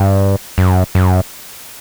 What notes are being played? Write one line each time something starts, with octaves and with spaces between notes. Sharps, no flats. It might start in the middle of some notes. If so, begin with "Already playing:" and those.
Already playing: G2
F#2
F#2